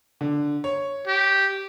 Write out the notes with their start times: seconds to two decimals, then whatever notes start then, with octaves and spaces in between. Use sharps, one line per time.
0.21 D3
0.64 C#5
1.07 G4